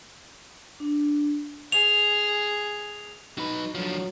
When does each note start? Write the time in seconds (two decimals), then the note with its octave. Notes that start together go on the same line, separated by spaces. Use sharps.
0.80 D4
1.72 G#4 F7
3.38 F#3 D#4 B4
3.75 D3 F3 F#3